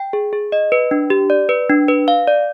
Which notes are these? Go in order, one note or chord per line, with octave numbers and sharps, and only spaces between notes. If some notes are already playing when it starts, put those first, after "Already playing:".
Already playing: G5
G#4
G#4
D#5
B4
D4
G4
D5
B4
D4
B4
F5
D5